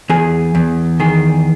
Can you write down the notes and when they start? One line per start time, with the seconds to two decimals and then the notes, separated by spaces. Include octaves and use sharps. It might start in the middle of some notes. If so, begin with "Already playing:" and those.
0.10 E2 G#4
0.55 E2
1.00 D#3 G#4